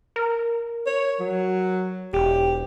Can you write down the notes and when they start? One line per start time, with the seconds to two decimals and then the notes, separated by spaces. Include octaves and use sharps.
0.16 A#4
0.87 C#5
1.20 F#3
2.13 E1 G4